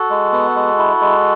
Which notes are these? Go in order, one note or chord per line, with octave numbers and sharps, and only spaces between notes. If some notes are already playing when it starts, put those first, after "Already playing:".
Already playing: F#4 A4
G#3
B3
G#3
E4
G#3